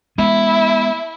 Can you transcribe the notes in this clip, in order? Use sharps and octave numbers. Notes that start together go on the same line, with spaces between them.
G#3 B3 E4